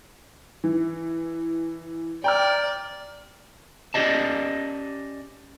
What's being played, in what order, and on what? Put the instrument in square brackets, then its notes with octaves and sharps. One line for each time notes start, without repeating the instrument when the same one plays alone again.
[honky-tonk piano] E3
[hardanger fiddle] D5 [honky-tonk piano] G5 A#5 F6
[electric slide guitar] C#4 F4 G4 D5 D#5 A5